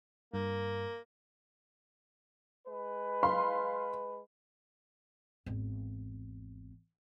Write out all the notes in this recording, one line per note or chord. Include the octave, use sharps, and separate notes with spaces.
G2 A#3
G#3 B4
F5 B5 C6
G#1 E2